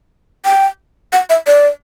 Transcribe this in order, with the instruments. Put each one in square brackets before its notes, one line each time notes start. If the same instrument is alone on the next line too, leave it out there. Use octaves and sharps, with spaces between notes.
[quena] G5
F#5
E5
D5